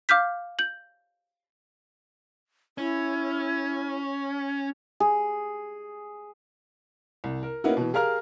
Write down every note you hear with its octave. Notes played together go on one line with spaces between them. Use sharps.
F5 D6 F6 G6 B6
G6 F#7
C#4 E4
G#4
C2
A#4
A#3 B3 C#4 D#4 E4 F#4
B2 E3
G4 G#4 A#4 F5 A#5 F6